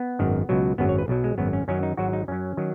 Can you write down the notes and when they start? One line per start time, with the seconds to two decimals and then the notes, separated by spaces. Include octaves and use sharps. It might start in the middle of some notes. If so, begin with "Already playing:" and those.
Already playing: B3
0.19 G#1 F#2 D#3
0.49 C#2 B2 F#3
0.78 G#1 F#2 F#3 B3
0.89 C#5
0.98 B4
1.08 B1 B2 F#3
1.24 G#3
1.38 G#1 F#2 F#3 B3
1.53 C#4
1.68 F#2 D#3 F#3 C#4
1.83 D#4
1.97 G#1 G#2 F#3 F#4
2.13 D#4
2.28 F#2 F#3 C#4
2.57 D#3 F#3